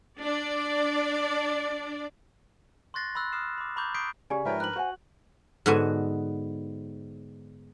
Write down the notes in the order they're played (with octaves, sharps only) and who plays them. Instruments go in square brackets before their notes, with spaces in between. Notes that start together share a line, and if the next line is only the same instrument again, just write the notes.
[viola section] D4 D5
[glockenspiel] C6 C#6 F#6 A6 A#6 C7
B5 C6 E6 F#6
D#6 F6 C7 E7
B5 D6
A#5 B5 C#6 D6 G6
C#6 D#6 G6 B6 C7 D7
[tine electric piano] C#3 [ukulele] C#4 B5 [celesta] G4 D5 G#5
[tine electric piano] G#2 F3 G5 [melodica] A#4 B4 [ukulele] C#5 E5
[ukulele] D4 B5 [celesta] F#6 F#7
[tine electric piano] F#4 [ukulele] C5 F#5 G#5
[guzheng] G#2 D3 B3 F#4 G#5